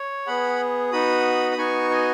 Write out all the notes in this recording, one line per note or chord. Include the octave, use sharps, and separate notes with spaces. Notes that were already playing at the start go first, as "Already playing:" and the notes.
Already playing: C#5
B3 G#4 F#5 B5
B3 D#4 F#4 B5 D#6
D#6
B3 D#4 F#4 G#5 C#6
D#5 G#5